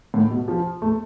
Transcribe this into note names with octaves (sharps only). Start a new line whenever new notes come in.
A2
B2
F3
A3